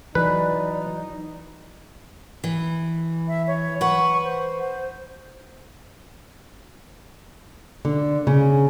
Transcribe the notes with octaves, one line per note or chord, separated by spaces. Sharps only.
E3 F#3 D#4 B4 D5
E3
E5
C#5
B4 F#5 C#6
C5
D3
C#3